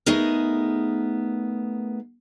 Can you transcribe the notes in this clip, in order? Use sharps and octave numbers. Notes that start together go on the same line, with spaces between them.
A3 B3 D#4 G#4 A#4